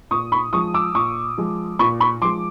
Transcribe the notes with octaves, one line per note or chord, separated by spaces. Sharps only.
A#2 C#6 D#6
B5 C#6
F3 G#3 C#6 D#6
D6 E6
A#2 C#6 D#6
F3 G#3
A#2 B5 C#6
B5 C#6
F3 G#3 C6 D6